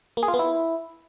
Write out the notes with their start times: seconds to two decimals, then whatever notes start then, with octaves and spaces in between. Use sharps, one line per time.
0.17 A#3
0.23 G#4
0.28 F4
0.34 B3
0.39 E4